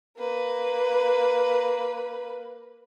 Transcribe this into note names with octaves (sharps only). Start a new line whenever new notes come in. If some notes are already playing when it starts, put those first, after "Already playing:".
A#3 B4